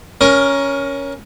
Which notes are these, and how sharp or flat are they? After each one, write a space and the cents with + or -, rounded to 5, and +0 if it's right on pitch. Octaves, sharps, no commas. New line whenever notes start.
C#4 +5 A#4 +20